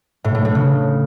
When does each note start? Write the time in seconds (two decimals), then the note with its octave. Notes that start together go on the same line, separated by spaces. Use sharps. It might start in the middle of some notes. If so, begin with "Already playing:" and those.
0.24 A2
0.35 A2
0.45 A2
0.55 C#3